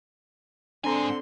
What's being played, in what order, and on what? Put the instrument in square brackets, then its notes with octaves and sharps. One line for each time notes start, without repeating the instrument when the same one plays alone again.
[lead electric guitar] G#2 G#5 [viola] D3 C6 [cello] C4 [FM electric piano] D4 A#5